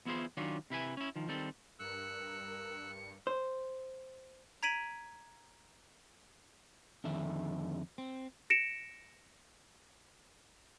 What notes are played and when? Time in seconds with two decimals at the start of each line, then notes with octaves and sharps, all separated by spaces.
0.05 E2 B3 E4 F4 G#4 C5
0.37 D#3 F#3 C#4 D4 F4
0.70 C3 E4 B4 G#5
0.97 C#4 E4
1.16 D#3 F3
1.28 D#3 G3 C4 A4
1.79 G2 A#4 E6 F#6 C#7
3.27 C5
4.63 A#5 G#6 B6 D7 D#7 F#7
7.04 F2 D3 D#3 E5
7.98 C4
8.50 A#6 C#7 D7 E7